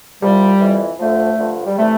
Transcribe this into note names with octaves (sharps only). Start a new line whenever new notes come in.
C2 C3 F3 G3
F2 E3
D2 D3 F3 A3
G2 D3 F3
G3
C3 E3 A3